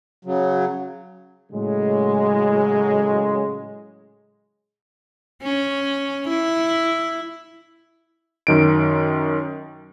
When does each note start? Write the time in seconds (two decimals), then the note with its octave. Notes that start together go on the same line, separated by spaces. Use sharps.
0.25 C#3 F#3
1.52 A2 C#3 F#3 G#3
5.42 C#4
6.28 E4
8.47 F#2 D#3 D7